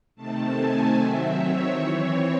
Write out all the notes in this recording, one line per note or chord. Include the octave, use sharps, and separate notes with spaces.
C3 D#3 A3 C4 A5
G#5
D#3 F#3 C4 E5
C#5
E3 C4